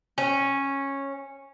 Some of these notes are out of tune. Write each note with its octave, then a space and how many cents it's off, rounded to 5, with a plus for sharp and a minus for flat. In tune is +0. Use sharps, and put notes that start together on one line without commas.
C#4 -10